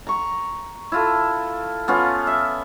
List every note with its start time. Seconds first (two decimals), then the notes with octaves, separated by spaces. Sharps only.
0.07 A#5 C#6
0.92 E4 F4 A4
1.88 B3 C#4 F4
2.27 E5